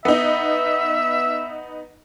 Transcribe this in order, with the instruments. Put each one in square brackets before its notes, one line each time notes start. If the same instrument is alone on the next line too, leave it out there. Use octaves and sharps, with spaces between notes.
[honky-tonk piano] B3 D#4 [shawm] E5